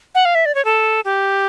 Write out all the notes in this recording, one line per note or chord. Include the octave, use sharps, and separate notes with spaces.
F#5
F5
E5
D5
C#5
A4
G4